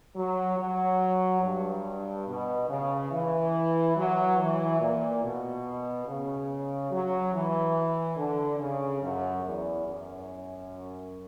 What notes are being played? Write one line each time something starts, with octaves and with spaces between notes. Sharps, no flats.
F#3
F#3
G2
B2
C#3
E3
F#3
E3
A#2
B2
C#3
F#3
E3
D3
C#3
F#2
E2
F#2